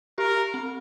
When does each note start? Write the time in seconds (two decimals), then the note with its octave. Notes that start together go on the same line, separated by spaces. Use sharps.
0.18 G4 A#4
0.54 C4